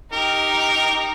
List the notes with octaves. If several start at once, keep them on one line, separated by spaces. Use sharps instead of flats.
D#4 G4 A#4